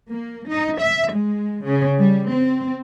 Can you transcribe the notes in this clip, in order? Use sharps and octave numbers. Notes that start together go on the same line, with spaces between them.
A#3
D#4
E5
G#3
C#3
G3
C4